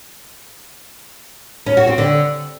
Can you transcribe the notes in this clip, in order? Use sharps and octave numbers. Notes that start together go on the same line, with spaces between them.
C#4
F#4
C4
D3